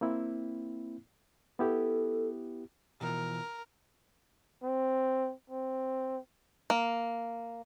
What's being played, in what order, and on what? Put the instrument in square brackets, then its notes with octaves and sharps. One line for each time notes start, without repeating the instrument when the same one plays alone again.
[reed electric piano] A#3 C4 E4
[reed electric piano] B3 E4 G4 [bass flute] A4
[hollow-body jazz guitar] B2 E3 F3 [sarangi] A#4
[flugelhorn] C4
C4
[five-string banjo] A#3